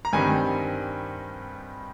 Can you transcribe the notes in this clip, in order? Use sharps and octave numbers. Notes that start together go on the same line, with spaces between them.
A#5
G2 D#3 G3 C4 G#5